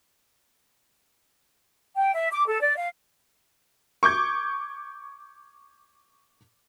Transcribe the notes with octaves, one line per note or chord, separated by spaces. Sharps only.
G5
E5
D6
A4
D5
F5
C#6 D6 G6 G#6